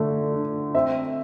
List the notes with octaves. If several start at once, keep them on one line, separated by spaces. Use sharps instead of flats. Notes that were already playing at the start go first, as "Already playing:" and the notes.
Already playing: D3 A3
D4
C4 E5